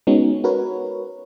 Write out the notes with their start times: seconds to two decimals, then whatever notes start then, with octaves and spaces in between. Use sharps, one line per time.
0.07 G#3 B3 C#4 D#4 F#4
0.44 F#4 A#4 B4 C#5